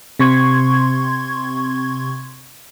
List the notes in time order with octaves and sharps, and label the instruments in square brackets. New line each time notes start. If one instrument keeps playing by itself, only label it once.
[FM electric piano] C3 C4 C6 C#6 G#6